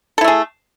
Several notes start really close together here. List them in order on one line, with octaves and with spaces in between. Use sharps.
A4 E4 A3 G#4